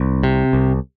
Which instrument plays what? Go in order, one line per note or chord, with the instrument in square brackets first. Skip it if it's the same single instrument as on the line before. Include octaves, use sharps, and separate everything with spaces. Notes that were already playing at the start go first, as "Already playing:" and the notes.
Already playing: [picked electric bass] C2
C3
C2